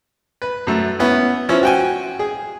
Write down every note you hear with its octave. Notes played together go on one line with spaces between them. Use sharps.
B4
F#2 A3
B3 C#4 E4
F3 C#4 E4
F#4 G5 G#5
G#4